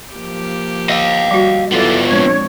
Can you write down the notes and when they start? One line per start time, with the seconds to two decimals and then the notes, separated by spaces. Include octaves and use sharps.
0.13 F3 A#3 G4
0.89 D#5 F5
1.31 G3 F#4
1.72 D#3 F#3 B3 E4 F4 A4 D5
2.07 A#2 F3 G#3 C4 D4 C#5